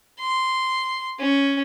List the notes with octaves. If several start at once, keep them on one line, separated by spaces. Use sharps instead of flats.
C6
C#4